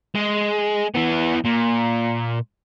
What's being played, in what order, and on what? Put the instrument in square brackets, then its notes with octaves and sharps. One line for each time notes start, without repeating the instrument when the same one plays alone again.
[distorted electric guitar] G#3
E3 B3
A#2